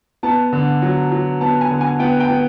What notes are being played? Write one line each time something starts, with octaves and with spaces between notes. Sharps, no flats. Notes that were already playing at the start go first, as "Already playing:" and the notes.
B3 A5
D3
F#3
F#3
B3 A5
G#5
D3
G#5
B3 G5
G5
B3